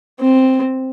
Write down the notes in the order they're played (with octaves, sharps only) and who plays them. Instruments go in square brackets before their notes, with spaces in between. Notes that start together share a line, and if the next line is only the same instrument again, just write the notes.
[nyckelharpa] C4